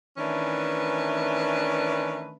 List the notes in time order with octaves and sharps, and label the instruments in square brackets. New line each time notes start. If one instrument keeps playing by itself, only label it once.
[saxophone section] D#3 E3 A3 C#4 D4 B4